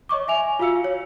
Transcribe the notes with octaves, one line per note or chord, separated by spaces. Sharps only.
C#5 D#5 C#6 D6
E5 G#5 F7
F4 F#4 F5 E6 C#7
C#5